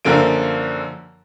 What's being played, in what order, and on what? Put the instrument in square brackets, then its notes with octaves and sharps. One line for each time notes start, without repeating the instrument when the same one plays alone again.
[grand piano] F#2 D3 F3 A#3 D7